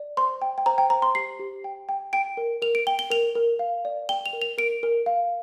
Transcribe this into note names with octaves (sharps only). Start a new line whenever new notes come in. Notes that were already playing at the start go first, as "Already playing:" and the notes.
Already playing: D5
C5 C6
G5
G5
C5 A#5
G5
C5 A#5
C6
G4 C7
G4
G5
G5
G5 D7
A#4
A#4 F7
D7
G5 G7
G7
A#4 F7
A#4
F5
D5
G5 G7
F7
A#4
F7
A#4 D7
A#4
F5